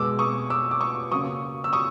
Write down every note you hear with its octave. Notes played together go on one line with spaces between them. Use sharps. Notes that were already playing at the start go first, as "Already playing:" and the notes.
Already playing: B2 G#3 D6 E6
C#6 D#6
D6 E6
D6
C#6 D#6
C#3 F#3 A#3 C#6 D#6
E6
C#6 D#6